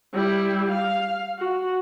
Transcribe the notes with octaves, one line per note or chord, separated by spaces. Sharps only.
G3 E4
F5
F#4